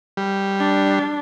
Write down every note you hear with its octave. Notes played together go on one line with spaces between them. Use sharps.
G3
D4